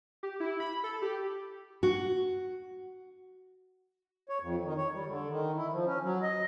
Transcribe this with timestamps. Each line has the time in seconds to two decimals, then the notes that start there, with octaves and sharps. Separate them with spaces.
0.23 G4
0.40 E4
0.60 B5
0.84 A4
1.02 G4
1.83 F#4
4.29 C#5
4.42 F2
4.65 D#3
4.77 C#5
4.94 G3
5.08 D3
5.29 D#3
5.56 E4
5.72 F3
5.86 C#4
6.03 F#3
6.23 D#5